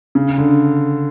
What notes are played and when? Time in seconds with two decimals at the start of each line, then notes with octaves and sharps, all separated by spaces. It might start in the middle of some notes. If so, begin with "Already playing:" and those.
0.15 C#3
0.38 D3